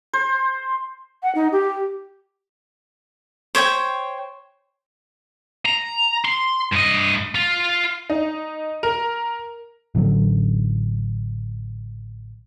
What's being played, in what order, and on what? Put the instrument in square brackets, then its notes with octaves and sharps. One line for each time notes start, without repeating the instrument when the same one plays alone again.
[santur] C5
[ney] F#5
D#4
G4
[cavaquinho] C5 C#5 D#5 G5
[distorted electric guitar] A#5
C6
G2 D#5
F4
[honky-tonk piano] D#4
A#4
[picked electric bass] A1 D3 F3 F#3